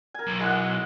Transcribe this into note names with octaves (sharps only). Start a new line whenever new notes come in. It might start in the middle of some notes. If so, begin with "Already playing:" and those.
A#4 G#5
B1
G#3 E4 F#5